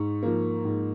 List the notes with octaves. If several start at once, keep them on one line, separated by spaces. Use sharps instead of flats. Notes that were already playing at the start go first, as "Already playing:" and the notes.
Already playing: G#2 C#6
F3 A#3
G#2